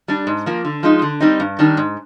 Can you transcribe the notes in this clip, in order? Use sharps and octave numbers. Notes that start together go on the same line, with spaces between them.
G3 D4
G#2
F3 A#3
D3
F3 G#3 D#4
D3
G3 C4 D#4
G2
D#3 G3 D4
G#2